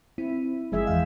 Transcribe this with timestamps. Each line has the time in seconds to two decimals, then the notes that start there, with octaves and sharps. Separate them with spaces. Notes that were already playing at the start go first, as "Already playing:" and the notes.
0.18 C4 E4
0.72 G1 F3 G#3 G#4 E5
0.87 E2 E3 F5